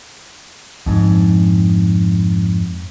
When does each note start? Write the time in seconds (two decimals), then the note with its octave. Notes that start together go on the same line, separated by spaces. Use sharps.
0.86 F2 G#2